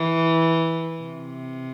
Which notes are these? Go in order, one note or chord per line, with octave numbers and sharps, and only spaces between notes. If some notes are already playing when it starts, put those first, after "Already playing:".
Already playing: E3
C3